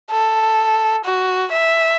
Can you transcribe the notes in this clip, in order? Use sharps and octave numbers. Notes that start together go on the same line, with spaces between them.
A4
F#4
E5